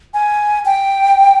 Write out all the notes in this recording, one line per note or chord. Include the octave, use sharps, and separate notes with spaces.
G#5
G5